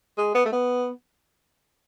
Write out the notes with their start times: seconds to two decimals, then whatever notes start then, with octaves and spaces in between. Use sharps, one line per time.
0.18 G#3
0.35 B3
0.45 A3
0.52 B3